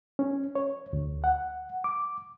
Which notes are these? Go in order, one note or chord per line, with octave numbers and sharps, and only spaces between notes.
C#4
C#5
D2
F#5
D6